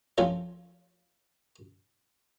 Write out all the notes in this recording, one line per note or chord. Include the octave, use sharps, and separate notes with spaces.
F3 C4 C#4 F4 A4 C#5